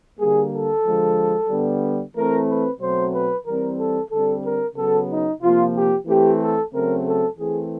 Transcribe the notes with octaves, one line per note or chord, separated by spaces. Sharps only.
D3 G3 A#3 G#4
A4
D3 F3 G#3
D3 G3 B3
E3 A3 C4 A#4
B4
B2 F#3 A3 C4 C5
B4
E3 G3 C4 A#4
A4
D3 G3 C4 A4
A#4
C#3 F#3 B3 A4
D#4
C3 F3 A#3 F4
G4
E3 A3 C4 G4
A4
C#3 F#3 A3 C4 A#4
A4
E3 A3 C4 G#4